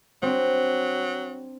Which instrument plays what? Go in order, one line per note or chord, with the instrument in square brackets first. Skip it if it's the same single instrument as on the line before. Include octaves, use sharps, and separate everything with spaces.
[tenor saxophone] F#3 [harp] C4 D4